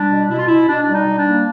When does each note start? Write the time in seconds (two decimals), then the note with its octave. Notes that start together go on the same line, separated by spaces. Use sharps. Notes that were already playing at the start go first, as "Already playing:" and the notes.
Already playing: G3 D4
0.11 B2
0.30 B2 E4
0.38 F4
0.47 B2 E4
0.68 B2 D4
0.82 D4
0.88 G3
0.93 D#4
1.06 G3
1.19 D4
1.25 A#3